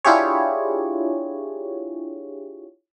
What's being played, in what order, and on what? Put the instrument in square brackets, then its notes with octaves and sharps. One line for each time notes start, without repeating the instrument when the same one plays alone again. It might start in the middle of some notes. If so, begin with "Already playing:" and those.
[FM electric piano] D4 E4 F4 G4 G#4 C#5